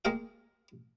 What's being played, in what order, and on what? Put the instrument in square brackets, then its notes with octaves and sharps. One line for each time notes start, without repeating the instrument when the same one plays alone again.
[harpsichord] G#3 A#3 G#4 A#4 F5 G5